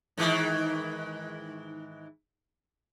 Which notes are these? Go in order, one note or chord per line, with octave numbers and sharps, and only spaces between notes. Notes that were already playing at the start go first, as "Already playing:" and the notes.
G#2 D#3 E3